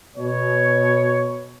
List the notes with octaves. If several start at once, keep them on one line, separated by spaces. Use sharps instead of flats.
B2 C#5